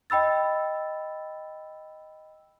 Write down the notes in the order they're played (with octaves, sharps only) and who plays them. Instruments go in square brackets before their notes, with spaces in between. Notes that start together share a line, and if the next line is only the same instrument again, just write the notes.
[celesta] D#5 G5 B5 E6 A6